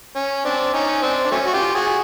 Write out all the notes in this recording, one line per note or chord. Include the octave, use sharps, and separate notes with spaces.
C#4
C4 D4
C#4 D#4
C4 D4
D4
F#3 A3 C#4
F#4
F4 G4
F#4 G#4